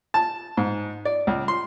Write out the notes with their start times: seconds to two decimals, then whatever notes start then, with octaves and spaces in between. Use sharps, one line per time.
0.14 A5
0.57 G#2
1.05 D5
1.27 C#2
1.48 C6